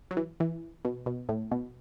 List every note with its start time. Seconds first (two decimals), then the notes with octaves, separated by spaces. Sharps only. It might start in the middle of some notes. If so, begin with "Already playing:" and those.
0.11 F#3
0.17 E3
0.40 E3
0.85 B2
1.06 B2
1.29 A2
1.51 B2